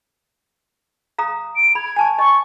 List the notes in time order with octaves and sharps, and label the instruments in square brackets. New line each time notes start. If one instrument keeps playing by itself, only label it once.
[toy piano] F5 A#5 D#6
[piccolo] D7
[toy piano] B5 [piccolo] G#6
[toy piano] G#5 A5 C#6
[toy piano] D#5 [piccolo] C#6